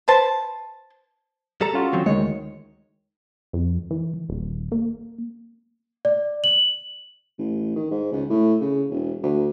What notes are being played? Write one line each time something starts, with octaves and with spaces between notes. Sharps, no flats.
B4 C5 A5
G3 A4 A#5
C#4 F4 F#4
D#3 F#3 C4
D2 D#3 G#3 C#5
F2
E3
D#1
A#3
D5
F#7
A1
D#3
G#2
C#2
A2
C#3
E1
D2